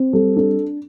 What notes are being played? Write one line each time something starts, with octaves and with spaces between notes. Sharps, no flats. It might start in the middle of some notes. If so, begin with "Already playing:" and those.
Already playing: C4
G3 A4
D4 A4